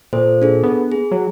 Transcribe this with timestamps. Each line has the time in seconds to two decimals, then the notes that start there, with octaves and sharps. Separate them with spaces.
0.13 A#2 A4 C5
0.42 D4 G#4 A4
0.63 B3
0.92 G#4
1.11 F#3